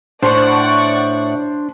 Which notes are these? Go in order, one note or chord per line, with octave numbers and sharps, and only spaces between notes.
A2 D4 C5 D5 F#5 C#6